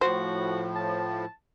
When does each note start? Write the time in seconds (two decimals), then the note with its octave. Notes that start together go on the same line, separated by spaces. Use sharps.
0.01 A2 F3 F#4 C5
0.75 A5